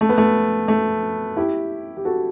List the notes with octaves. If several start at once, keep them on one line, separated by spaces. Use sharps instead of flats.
A3
B3
A3
A3
E4 G4
G4
F#4 A4